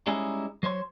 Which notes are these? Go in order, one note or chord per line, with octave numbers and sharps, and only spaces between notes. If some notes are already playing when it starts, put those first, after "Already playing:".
G3 G#3 C#4 D#4 E4 G#4
F#3 C5 C#5 C6